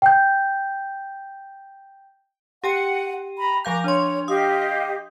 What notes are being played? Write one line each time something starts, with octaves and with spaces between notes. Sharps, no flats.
G5 G6
G4 F#5 G5 D#7
A#5 B5
F3 F5 A#5 D6 G6
D4 C#5 C6
G4 D#5 F5 D#6